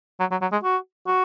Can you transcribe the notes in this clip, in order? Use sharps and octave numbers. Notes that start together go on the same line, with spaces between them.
F#3
F#3
F#3
G#3
F#4
F#4